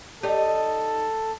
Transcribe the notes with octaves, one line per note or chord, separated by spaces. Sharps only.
D#4 G4 A4 D5